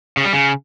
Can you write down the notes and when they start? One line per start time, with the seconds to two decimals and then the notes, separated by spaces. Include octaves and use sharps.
0.17 C#3
0.25 G3
0.33 C#3